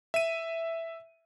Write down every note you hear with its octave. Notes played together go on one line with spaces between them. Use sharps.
E5 D#7